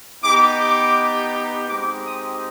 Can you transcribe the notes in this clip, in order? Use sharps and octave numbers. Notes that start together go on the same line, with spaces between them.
B3 D#4 G4 D6
D6
G#3 C4 D#4 G4 D6
D#6